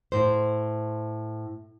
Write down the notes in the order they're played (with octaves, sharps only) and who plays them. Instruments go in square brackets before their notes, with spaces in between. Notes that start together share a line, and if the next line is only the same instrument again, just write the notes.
[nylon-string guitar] A2 C5